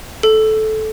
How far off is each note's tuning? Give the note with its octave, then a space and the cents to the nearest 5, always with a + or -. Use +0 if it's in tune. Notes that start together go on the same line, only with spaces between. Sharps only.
A4 -15